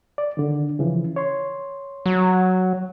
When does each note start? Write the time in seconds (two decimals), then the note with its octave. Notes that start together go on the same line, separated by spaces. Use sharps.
0.18 D5
0.37 D3 D#3
0.79 C#3 E3 F3
1.16 C#5 C6
2.06 F#3